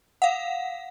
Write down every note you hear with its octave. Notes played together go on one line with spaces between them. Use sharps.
F5 F#5